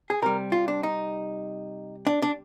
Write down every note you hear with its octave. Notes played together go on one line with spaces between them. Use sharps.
G#4
C3 G3 A#4
F4
D4
D#4
D4
D4